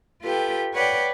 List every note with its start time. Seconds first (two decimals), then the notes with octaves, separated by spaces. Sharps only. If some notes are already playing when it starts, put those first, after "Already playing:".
0.23 F4 G4 A4 B4 G5
0.75 B4 C#5 D5 F#5 G5